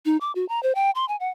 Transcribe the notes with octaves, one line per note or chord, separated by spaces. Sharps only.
D#4
D6
F#4
A#5
C5
G5
C6
G#5
F#5